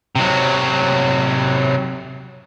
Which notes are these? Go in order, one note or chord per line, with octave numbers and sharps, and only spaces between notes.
C3 F#3